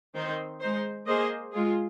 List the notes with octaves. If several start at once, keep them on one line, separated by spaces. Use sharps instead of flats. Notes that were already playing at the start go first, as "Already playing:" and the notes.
D#3 C4 D#4 C5
G#3 D#4 C5
A#3 G#4 C5 D#5
G#3 F4 G#4